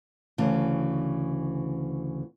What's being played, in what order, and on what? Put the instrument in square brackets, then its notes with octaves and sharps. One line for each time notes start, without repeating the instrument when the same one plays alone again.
[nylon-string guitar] D2 C#3 E3